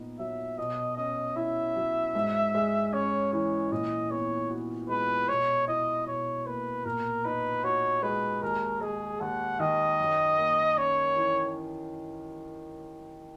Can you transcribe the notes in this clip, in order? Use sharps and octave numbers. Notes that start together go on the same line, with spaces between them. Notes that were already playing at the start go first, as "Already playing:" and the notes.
Already playing: A#2 B3 D#4
F#3 E5
B2 D#5
C#4 D#5
E4 E5
F#3
G#2
G#3
C#4 C#5
E3 C#5
A#2 D#5
B3 C#5
F#4
G#3 B4
B2 C#5
E4 D#5
B2 C#5
A#3 B4
A#2 A#4
D#4 B4
F#4 C#5
G#3 B4
D#2 A#4
G#3 G#4
D#2 F#5
D#3 D#5
F#2
A#3
C#4 C#5
E3